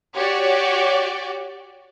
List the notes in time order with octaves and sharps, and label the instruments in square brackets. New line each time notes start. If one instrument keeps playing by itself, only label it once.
[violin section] F#4 G4 C#5 D5